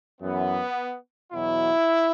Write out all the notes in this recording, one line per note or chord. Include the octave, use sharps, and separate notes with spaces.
F#2 E3 B3
E2 B2 F#3 E4